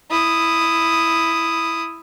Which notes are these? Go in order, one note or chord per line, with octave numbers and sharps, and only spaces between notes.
E4 D#6